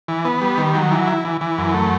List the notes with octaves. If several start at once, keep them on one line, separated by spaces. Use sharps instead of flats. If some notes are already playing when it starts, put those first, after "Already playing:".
E3
B3
G3
D#3
F#3
E3
E4
E3
E3
F#2
A3